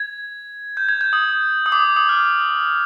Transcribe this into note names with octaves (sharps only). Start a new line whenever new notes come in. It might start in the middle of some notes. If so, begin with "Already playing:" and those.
Already playing: G#6
G6
G#6
G6
D#6
D#6
D6
D#6
F6